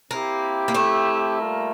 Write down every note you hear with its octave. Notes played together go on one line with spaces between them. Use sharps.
A#3 C4 E4 G4
A#3
A3
G3 A#3 F4 A#4